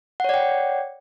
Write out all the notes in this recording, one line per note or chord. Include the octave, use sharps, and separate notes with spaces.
C#5 D5 F#5 G5